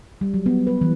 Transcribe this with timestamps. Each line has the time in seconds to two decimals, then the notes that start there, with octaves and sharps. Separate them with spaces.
0.21 G3
0.34 F#3
0.46 B3
0.67 B4
0.81 E3